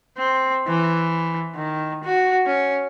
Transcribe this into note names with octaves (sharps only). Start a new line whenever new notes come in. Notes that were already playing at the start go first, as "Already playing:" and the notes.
C4
E3
D#3
F#4
C#4